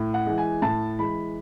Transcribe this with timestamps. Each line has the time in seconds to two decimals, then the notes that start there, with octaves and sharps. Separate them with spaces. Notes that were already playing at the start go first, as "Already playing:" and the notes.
Already playing: A2
0.14 F#5
0.26 E3 G#3
0.38 G#5
0.62 A2 A5
0.99 E3 G#3 B5